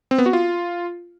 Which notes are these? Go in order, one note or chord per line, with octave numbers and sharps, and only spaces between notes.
C4
B3
F#4
F4